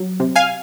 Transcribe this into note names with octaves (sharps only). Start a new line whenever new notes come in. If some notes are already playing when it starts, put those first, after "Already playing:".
Already playing: F#3
C3
F5 G#5